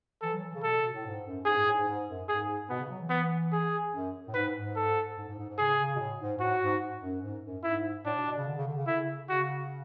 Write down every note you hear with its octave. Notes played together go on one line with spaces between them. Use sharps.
E3 A4
F#3
E3
C#3
B2 A4
B2
A2
G#2
F#2
G#2 G#4
G#2
A2
G#2
G#2
F#2
G#2 G#4
B2 B3
C#3
F#3
E3
B3
G#4
F#2
A2
G#2 B4
G#2
A4
G#2
G#2
G#2
G#2
C#3 G#4
C#3
B2
A2
G#2
G#2
A2 F#4
G#2
F#2
G#2
F#2
G#2 E4
A2 D4
B2
B2
C#3
D3
C#3
D3
C#3
D3 E4
C#3
C#3 F#4